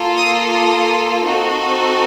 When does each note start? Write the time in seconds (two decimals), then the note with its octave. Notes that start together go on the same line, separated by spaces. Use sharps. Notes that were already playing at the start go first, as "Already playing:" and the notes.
Already playing: A#3 F4 A4
0.16 D#6
0.52 D#6
1.24 C4 D#4 F#4 A4